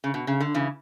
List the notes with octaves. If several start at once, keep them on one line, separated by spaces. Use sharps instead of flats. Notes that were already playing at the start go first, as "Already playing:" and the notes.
C#3
B2
C#3
D3
C#3 E3